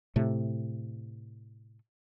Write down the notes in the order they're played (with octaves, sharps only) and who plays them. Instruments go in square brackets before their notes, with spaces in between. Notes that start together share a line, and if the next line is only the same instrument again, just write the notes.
[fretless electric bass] A2 C3 A3